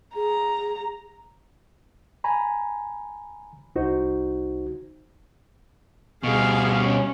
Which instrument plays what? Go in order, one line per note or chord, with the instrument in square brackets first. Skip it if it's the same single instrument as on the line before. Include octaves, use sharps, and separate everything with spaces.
[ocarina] G#4 [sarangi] A#5
[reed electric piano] G#5 A#5 B5
C2 D#4 F#4 C5
[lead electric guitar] B2 G3 [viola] G#4 F5
[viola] C#4